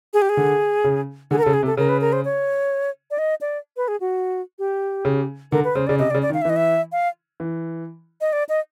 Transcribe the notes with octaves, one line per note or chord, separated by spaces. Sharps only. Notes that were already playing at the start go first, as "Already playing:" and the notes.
G#4
G4
G#4
D3
C#3
D3 G#4
A#4
C#3 A4
G#4
C3
A4
C#3 A#4
B4
A#4
C5
C#5
D5
D#5
D5
B4
G#4
F#4
G4
C#3
D3 A#4
B4
C#3 C5
C#3 D5
C3 D#5
D5
C#3
D5
D#3
F5
E5
E3 D#5
E5
F5
E3
D#5
D5
D#5